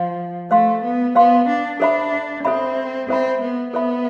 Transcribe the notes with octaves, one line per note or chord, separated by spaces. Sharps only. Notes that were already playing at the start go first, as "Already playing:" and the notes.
Already playing: F3 C5 F5 C6
A3 C5 F5 C6
B3
B3 C5 F5 C6
D4
D4 A4 C5 E5 B5
C4 A4 C5 E5 B5
C4 A4 C5 E5 B5
B3
B3 A4 C5 E5 B5